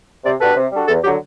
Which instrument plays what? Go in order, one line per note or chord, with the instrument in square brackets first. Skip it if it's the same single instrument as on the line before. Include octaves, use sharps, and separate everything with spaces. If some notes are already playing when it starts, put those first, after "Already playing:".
[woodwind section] C3 [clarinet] D5
[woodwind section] G3 D4 F#4 A4 [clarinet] B4
[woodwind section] C3
G3 D4 F#4 A4
[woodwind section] E2 [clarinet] A4
[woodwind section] D3 F#3 [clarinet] G4